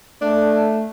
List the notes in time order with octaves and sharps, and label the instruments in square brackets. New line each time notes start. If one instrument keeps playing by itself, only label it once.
[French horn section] A3 [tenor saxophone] D4